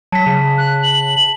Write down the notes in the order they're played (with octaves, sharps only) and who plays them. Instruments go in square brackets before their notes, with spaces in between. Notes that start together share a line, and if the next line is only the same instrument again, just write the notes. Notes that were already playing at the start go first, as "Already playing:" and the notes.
[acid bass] F#3 [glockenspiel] A5 B6
[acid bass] C#3
[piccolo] F#6
F#7